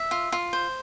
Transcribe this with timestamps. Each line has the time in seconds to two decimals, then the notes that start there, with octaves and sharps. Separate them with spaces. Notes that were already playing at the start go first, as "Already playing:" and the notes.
Already playing: E5
0.11 F4
0.32 F4
0.53 C5